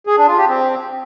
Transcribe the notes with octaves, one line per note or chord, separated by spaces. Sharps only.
G#4
D4
F4
G4
C4